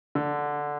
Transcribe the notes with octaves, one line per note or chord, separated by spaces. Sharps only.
D3